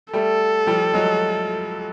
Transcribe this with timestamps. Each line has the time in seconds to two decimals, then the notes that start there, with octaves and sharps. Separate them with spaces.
0.13 G3 A3 A4
0.67 F3 G3
0.94 F#3 G#3